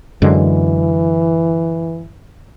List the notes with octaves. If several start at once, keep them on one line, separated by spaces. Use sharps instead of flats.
F#2 D3 E3 G#3